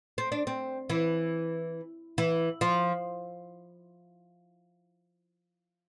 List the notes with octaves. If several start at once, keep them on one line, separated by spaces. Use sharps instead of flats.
C4
D4
C4
E3
E3
F3